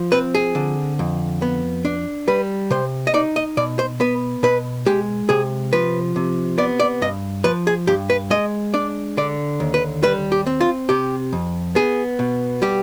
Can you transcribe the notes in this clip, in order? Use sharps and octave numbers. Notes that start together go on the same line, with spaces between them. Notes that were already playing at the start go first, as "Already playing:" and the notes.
Already playing: F3
C4 B4
G#4
D3
F2
B3
D4
G3 B4
C3 C5
D#5
D#4 D5
D#5
B2 D5
C5
B3 B4
B2 B4
G#3 G4
C3 G#4
F3 B4
C3
B3 D5
D5
G2 D#5
F3 B4
G#4
G2 G4
B4
G#3 D#5
D4 D5
D3 D5
D#2
B4
G3 B4
G4
C4
F4
C3 G4
F2
B3 G#4
B2
G3 G4